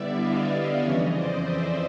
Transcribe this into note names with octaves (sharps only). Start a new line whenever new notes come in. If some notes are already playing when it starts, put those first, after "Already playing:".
Already playing: D3 G3 B3 E4 D5 E5
D#5 F5
D5 E5
F2 C#3 E3 C#5 D#5
C5 D5
D5 E5